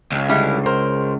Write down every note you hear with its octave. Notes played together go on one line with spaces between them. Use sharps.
C#2
D3 G3 E4
A#4 C5